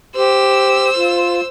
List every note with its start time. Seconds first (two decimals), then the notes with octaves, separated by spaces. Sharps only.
0.16 G4 C5 E6
0.97 F4